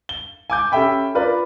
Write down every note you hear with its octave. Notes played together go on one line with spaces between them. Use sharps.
G7
G#5 D6 G6
C#4 G4 A4 E5 G5 B5
F4 A#4 B4 D5 B5